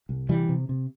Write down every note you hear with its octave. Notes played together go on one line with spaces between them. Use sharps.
C2
C3 E3 G3
C3
C3